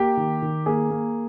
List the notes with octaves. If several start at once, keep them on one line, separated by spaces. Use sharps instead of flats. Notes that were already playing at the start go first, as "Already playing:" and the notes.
Already playing: A#3 G4
D#3
D#3
A#3 G#4
A#3